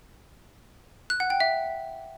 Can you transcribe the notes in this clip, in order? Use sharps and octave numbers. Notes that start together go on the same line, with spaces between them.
F#6
F#5
G5
E5